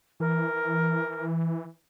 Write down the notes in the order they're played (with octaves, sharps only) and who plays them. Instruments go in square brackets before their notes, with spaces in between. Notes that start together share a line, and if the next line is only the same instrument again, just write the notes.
[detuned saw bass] E3 [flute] A#4